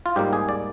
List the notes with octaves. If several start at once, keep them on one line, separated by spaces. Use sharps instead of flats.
F4
G#2 G3 A#3 G4
G#4
D5